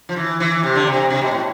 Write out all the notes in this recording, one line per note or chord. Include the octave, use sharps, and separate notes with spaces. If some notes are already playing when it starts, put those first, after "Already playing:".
F3
E3
E3
C3
D3
C3
C3
B2
A2